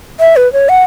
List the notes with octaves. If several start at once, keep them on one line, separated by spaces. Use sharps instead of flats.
E5
B4
C#5
F#5